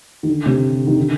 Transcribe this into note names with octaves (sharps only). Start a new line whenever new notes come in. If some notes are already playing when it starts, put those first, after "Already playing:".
D#3
D3
C3
D#3
D3